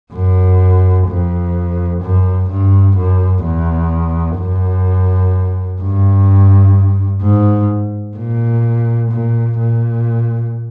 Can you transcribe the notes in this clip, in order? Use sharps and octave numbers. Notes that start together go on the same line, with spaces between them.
F#2
F2
F#2
G2
F#2
E2
F#2
G2
G#2
A#2
A#2
A#2